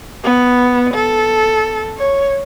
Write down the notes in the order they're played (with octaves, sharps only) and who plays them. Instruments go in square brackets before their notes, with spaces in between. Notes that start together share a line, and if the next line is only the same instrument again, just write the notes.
[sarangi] B3
A4
C#5